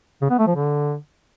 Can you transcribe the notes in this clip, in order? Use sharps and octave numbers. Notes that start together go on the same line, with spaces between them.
C#3
B3
A3
F3
D3